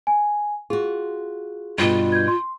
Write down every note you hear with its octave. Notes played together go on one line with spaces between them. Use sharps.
G#5
F4 F#4 G#4
G2 B2 F4
G6 G#6
C6